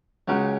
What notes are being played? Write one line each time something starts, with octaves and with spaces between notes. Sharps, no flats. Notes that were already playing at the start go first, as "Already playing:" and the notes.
C#2 C#3 F#3